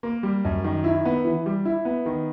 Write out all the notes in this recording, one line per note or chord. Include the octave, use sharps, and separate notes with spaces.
A#3
G3
F#2
D#3
E4
B3
E3
G3
E4
B3
D#3